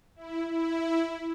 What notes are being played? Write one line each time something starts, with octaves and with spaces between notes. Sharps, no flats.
E4
E4